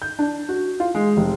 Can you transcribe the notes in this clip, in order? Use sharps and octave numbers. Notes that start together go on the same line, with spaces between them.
G6
D4
F#4
F4
G#3
F1